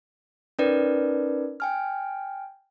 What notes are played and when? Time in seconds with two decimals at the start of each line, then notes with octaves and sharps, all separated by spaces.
0.59 C#4 D#4 A#4 B4 D5
1.60 G5 G#5 F6